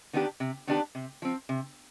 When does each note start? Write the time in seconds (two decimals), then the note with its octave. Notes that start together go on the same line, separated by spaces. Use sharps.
0.13 D#3 B3 D4 G4
0.40 C3
0.67 D#3 B3 D4 G4
0.95 C3
1.22 F3 C4
1.49 C3